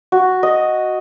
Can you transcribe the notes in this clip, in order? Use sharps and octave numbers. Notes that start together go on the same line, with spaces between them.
F#4
D#5